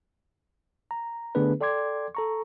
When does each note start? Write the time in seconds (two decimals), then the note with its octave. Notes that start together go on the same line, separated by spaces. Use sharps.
0.91 A#5
1.35 D3 A3 B3 D4 G#4 B4
1.61 A4 D5 G5 C6 D6 G#6
2.15 A4 A#5 C#6